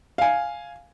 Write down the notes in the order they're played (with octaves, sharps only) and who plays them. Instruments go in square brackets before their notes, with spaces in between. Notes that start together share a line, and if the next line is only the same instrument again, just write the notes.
[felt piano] F5 G#5